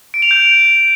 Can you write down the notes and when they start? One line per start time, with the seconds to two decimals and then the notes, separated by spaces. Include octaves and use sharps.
0.14 D7
0.22 F7
0.31 G6